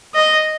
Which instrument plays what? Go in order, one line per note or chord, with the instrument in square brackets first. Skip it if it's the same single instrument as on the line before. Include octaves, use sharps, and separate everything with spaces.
[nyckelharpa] D#5